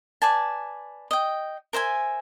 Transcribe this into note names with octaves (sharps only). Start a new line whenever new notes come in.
B4 D5 G#5 A5
D#5 G5
A#4 C5 E5 G#5